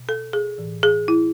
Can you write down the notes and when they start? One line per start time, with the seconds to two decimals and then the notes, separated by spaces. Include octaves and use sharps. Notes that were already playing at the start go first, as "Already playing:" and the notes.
Already playing: B2
0.09 A4
0.33 G#4
0.58 A2 E3
0.83 G#4
1.08 E4